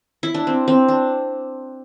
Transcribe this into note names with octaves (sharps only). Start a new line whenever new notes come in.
E4
D4
C4
C4
D4